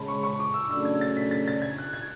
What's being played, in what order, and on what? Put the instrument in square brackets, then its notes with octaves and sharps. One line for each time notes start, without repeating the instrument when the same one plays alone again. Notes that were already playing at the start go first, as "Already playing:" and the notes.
Already playing: [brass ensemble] C#3 G#3 C#4 [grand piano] A5 B5
[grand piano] C#6
C#6
D6
E6
[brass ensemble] C#3 F#3 A3 D4 [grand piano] E6
[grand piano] G#6
A6
B6
A6
A6
G#6
F#6
G#6